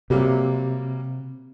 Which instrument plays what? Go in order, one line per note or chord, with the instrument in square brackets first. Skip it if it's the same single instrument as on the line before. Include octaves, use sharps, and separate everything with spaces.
[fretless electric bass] C3 [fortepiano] F#3 G3 A#3